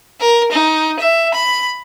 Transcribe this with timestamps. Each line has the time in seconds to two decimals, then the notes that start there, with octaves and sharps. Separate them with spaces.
0.20 A#4
0.51 D#4
0.99 E5
1.34 B5